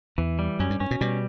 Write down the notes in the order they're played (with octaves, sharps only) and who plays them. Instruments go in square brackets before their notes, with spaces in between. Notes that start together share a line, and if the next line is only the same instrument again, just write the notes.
[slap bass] E2 [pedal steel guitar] E3
[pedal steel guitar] G3
[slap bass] F#2 [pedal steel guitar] C#4
[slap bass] G2
[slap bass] G2 [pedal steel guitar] C#4
[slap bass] B2
[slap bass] B2 [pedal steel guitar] G3